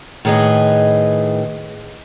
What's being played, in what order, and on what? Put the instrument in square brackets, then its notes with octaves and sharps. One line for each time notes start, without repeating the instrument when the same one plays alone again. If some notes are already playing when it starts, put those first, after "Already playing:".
[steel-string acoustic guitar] A2 D#3 G#4 B4 D#5